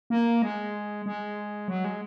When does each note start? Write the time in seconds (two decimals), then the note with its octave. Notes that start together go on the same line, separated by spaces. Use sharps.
0.10 A#3
0.42 G#3
1.06 G#3
1.68 F#3
1.84 G#3